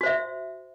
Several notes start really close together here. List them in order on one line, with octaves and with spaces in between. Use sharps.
F#4 C5 E5